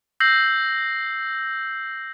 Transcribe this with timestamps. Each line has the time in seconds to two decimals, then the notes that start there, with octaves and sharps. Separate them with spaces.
0.20 E6 G6 A#6 C7 F#7